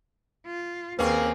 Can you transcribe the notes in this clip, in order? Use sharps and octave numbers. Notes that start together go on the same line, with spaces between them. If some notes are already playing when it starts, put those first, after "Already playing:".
F4
D#2 A#3 C4 C#4 G#4 B4 G5 C#6